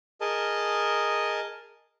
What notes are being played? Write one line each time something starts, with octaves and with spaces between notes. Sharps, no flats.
G#4 A#4 D#5 A5